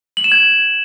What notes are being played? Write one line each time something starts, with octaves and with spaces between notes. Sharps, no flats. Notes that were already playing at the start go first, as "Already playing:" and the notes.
F#7
E7
G#6